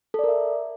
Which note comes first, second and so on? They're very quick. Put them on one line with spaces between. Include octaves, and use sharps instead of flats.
A4 D5 A#4 E5